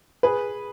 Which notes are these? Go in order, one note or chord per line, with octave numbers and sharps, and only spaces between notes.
G#4 B4